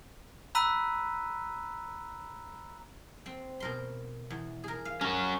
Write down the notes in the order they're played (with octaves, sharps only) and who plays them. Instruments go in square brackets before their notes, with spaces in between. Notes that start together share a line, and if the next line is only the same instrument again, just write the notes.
[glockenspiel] A#5 B5 E6 F#6 B6 D#7
[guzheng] C4
B2 A#4 C6
E2
G#4 A#4
F5
[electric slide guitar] C#4 F#4 [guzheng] A#4